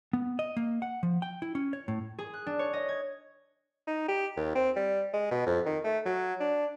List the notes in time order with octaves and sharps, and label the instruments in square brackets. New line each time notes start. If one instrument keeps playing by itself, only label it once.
[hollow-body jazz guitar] B3
D#5
A#3
F#5
F3
G5
E4
C#4
C#5
A2
[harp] G#4
F#6
D4
C#5
D#5
G#6
[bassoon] D#4
G4
D#2
C4
G3
G#3
B2
F2
D#3
A3
F#3
D4